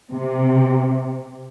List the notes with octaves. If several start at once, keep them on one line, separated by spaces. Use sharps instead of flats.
C3